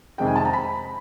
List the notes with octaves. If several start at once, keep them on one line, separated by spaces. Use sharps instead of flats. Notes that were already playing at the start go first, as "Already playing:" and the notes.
F2 C3 D#3 G#3 C4 G5
G#5
A5
A#5
B5